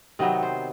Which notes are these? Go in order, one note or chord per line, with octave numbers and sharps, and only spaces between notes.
C3 D#3 F#3 B3 D#5
C5